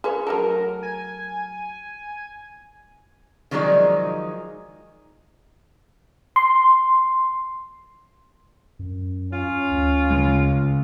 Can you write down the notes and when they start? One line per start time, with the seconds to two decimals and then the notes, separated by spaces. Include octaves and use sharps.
0.04 G#4 B4 C#5
0.27 F#3 A3 A4 A#4
0.83 G#5
3.51 D#3 F3 F#3 G#3 D#4 D5
6.36 C6
8.79 F#2
9.33 C#4 F4
9.71 D2
10.10 C#3 G#3